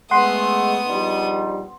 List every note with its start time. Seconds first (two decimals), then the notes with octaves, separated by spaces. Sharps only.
0.11 G#3 A3 B3 F#5 C6 D#6
0.86 A#1 G3 D#4